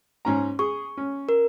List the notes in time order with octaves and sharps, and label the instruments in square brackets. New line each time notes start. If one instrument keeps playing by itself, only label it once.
[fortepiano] G#2 C#4 A#5
[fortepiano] G#4 [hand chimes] C#6
[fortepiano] C#4
[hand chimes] A#4